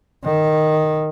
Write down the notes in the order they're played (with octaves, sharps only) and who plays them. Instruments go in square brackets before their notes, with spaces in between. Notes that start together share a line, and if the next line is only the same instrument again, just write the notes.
[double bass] D#3